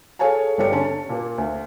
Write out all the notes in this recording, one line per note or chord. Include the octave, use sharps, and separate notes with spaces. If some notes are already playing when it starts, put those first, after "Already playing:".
G#4 A4 C#5 F5 G#5 A5
G1 G3 A4 C#5 C#7
D3 C#4 A5
A5
A#2 A#3
D2